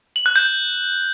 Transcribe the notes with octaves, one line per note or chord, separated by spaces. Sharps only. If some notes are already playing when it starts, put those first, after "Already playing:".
F#7
F#6
G6